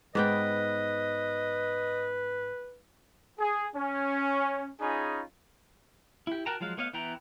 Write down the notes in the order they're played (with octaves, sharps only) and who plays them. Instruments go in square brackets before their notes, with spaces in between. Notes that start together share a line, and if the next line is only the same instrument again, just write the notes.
[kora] G#2 B3 G5 [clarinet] B4 [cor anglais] D#5
[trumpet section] G#4
C#4
C#4 D#4 F4 G#4 G#5 B5
[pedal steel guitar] E4 G4
F#4 A#4 G5 A5 A#5
F3 F#3 G#3 F5
A3 B3 C#5 D#5 F5
E3 B3 E4 G5 A#5